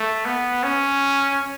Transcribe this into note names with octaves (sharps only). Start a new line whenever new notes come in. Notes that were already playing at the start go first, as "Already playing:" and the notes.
Already playing: A3
B3
C#4